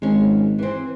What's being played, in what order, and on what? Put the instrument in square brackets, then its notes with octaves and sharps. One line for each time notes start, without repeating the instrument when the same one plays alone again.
[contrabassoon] G#1 [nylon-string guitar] G#3 C#4
[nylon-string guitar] E3 C4